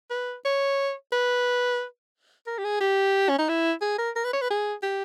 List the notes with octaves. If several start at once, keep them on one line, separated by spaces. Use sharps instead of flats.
B4
C#5
B4
A#4
G4
G#4
G4
C#4
D#4
E4
G#4
A#4
A#4
B4
C#5
B4
G#4
G4